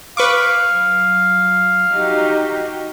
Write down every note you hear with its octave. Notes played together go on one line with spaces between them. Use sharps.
B4 F5 C#6 D6
F#3
D#4 F#4 G4